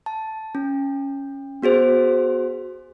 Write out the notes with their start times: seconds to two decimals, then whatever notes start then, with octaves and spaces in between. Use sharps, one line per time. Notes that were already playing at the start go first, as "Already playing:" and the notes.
0.06 A5
0.55 C#4
1.62 B3 F#4 G#4 C5